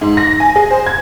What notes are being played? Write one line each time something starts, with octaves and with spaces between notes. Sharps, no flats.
G#2
A#6
G#5
G#4
C5
G#6